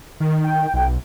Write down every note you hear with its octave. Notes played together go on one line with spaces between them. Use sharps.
D#3
G5
B1